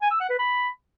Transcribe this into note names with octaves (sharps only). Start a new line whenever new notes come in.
G#5
E6
F#5
B4
B5